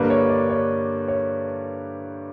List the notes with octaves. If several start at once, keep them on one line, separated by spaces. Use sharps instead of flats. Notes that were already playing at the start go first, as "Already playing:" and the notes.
Already playing: G2 D3 G3 A#3 B4
C#5
D5
C#5
C#5